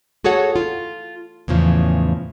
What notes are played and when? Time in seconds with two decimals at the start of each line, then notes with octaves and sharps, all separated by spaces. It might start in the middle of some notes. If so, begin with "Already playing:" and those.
0.24 F#4 G#4 A4 C#5 F#5
0.56 F4
1.48 E2 A2 C#3 F3